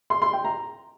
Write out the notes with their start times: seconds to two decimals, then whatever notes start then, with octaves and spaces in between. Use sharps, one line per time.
0.10 C6
0.22 C6
0.33 G5
0.45 A#5